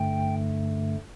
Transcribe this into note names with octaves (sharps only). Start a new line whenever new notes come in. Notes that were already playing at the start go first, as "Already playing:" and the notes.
Already playing: G2 D3 A3 G5